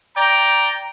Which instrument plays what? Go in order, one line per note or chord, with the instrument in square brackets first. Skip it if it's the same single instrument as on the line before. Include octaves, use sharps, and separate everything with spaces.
[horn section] D5 G5 A#5